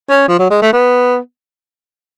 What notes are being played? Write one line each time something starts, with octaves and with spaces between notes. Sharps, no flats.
C#4
F3
F#3
G#3
A3
B3